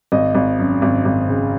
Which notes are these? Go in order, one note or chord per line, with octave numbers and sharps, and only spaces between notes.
G#1 D#5
G#1
F#2
G#1
G#1
C#3